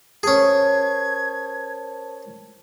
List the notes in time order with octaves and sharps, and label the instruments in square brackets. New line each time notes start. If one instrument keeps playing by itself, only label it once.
[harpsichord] C#4 G#4 [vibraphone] A#4 C5 A5 [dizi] G#6